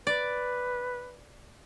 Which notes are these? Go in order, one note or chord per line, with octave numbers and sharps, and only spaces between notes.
B4 D5